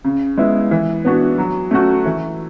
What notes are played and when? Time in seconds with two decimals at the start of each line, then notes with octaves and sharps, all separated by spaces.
0.04 C#3
0.37 G#3 B3 E4
0.71 E3
1.05 B3 D4 F#4
1.38 F#3
1.71 A3 C#4 F#4
2.05 E3